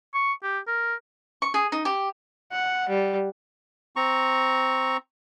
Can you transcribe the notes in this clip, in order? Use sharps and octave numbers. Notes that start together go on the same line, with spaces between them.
C#6
G4
A#4
C#6
G#4
D#4
G4
F#5
G3
C4 A#5 C#6